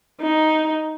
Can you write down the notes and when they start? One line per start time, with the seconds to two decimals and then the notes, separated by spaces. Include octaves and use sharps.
0.21 D#4